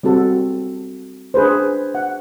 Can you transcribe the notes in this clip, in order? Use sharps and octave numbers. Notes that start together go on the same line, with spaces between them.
G3 C4 F#4 A4
D4 G#4 B4 C5
F#5